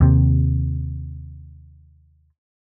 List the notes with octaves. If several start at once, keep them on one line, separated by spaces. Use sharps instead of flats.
D#2 C3